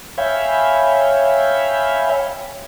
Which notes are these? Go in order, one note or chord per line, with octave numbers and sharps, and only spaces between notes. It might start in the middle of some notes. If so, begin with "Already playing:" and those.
C#5 E5 F5 G5 G#5 B5